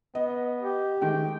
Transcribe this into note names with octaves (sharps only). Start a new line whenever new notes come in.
B3 D#5
G4
D#3 G#3 A3 G5